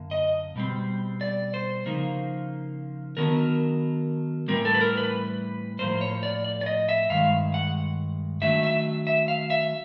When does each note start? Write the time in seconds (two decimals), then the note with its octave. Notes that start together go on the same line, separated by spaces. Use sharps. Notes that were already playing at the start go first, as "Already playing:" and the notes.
Already playing: F#2 D3 A#3
0.11 D#5
0.56 B2 G3 C4
1.21 D5
1.54 C5
1.86 C#3 F3 A#3 D#4
3.17 D#3 F#3 B3 D4 A#4
4.48 A2 E3 G3 C4 A#4
4.65 A4
4.74 B4
4.81 A#4
4.97 B4
5.79 A2 F3 A#3 C5
6.01 C#5
6.23 D5
6.44 D5
6.61 D5
6.66 D#5
6.89 E5
7.10 G2 D#3 G#3 F5
7.54 F#5
8.41 D#3 F#3 A3 D4 E5
8.63 E5
9.07 E5
9.28 F5
9.50 E5